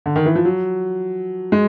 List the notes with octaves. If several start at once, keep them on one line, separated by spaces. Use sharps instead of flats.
D3
D#3
E3
F3
F#3
G#3